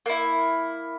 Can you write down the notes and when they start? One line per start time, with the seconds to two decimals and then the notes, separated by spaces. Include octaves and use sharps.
0.06 A#3 E4